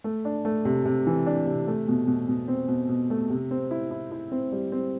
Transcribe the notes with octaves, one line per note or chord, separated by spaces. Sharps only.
A3
D4
A3
C3
C3
E3
D4
C3
A3
B2
B2
B2
C4
B2
B2
A3
C3
C4
E4
E4
E4
C4
G3
C4